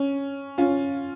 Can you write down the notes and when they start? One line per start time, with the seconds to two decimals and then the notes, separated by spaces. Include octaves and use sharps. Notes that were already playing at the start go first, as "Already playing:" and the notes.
Already playing: C#4
0.58 C#4 F4